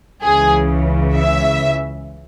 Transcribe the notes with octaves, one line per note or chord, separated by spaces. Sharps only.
C#2 C#3 E3 G#4
E5